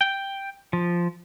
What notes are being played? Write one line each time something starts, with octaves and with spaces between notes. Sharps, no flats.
G5
F3